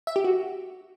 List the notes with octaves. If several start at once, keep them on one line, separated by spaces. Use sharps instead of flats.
E5
G4
F#4